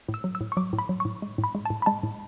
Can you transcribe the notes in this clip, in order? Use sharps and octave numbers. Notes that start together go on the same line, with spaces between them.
A2
E6
F#3
E6
A2
C#6
F#3 D6
A2
B5
F#3
A2 C#6
G#3
A2
B5
G#3
A2 A5
B5
G#3 A5
A2